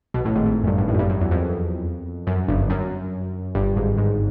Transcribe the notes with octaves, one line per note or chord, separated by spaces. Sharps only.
B1 B2
A1 A2
G#1 G#2
G#1 G#2
F#2
G1 G2
G1 G2
A1 A2
F#2
G1 G2
F#2
E2
F2
F#2
G1 G2
F#2
G1 G2
G#1 G#2
G#1 G#2